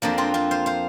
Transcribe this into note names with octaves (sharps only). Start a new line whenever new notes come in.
F2 F3 A#3 D4
C4 F4
C4 F4
C5 F5
C5 F5